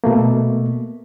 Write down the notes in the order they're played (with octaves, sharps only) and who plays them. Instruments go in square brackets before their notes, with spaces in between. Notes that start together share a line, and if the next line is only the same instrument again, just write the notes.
[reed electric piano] B2 A3 A#3